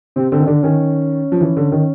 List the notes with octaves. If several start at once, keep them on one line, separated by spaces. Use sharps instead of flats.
C3 C4
D3 C4
D#3
D3 D4
D#3 C#4
F3
E3
D3
D#3